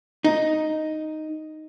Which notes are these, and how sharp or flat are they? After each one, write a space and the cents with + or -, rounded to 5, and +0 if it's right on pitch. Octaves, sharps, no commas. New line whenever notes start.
D#4 +0